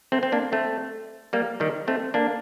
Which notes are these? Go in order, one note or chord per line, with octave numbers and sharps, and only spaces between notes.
A3 C4
C4
A#3 D4
A3 C4
G3 A#3
D#3 G3
A3 C4
A#3 D4